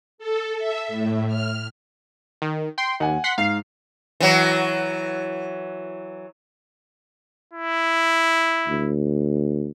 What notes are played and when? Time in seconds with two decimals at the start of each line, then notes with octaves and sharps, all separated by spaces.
0.18 A4
0.58 E5
0.88 A2
1.27 F6
2.42 D#3
2.78 G5 C6
3.00 D#2 F#5 G#5
3.24 F#5 C6 B6
3.38 G#2 F5 C7
4.20 E3 F#3
7.53 E4
8.68 D2